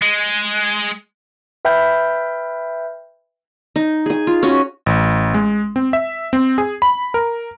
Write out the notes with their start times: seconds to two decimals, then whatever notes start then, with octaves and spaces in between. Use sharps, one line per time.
0.02 G#3
1.65 B4 E5 G5 B5 F6 G6
3.76 D#4
4.06 G#4 G#5
4.27 F4
4.43 C#4 F#4 G#5
4.86 A1
5.34 G#3
5.76 C4
5.93 E5
6.33 C4
6.58 G#4
6.82 B5
7.14 A#4